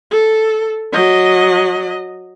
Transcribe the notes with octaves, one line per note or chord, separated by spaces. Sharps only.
A4
F#3 D#5